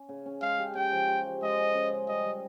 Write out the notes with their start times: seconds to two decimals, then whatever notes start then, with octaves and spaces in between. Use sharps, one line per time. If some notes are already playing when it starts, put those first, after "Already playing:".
Already playing: C#4
0.09 C#3
0.26 C#4
0.41 G#3 F5
0.59 G4
0.75 C#4 G5
0.92 F3
1.08 G4
1.25 F3
1.42 G#3 D#5
1.59 C#4
1.75 C#3
1.92 C#3
2.08 G3 D#5
2.25 G3